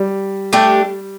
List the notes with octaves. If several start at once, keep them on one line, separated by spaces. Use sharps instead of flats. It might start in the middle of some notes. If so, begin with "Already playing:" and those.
Already playing: G3
A3 D4 G4